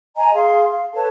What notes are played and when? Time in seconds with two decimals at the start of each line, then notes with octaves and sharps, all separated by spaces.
0.16 D#5 G#5 A#5
0.34 G#4 F5 C6
0.70 F5
0.94 A4 B4 C#5 A5